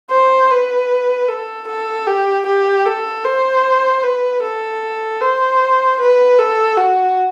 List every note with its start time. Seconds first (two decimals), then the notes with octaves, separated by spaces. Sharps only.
0.10 C5
0.50 B4
1.29 A4
1.68 A4
2.07 G4
2.46 G4
2.86 A4
3.25 C5
4.03 B4
4.42 A4
5.21 C5
6.00 B4
6.39 A4
6.78 F#4